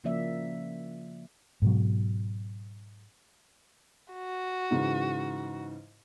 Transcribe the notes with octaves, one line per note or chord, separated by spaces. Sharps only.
C#3 F3 A#3 C#4 D5 E5
G#2 B2 F#3
F#4
G#2 C#3 E3